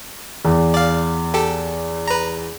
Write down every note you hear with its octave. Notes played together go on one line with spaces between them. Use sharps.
E2
D5 F5
G4 A4
B4 A#5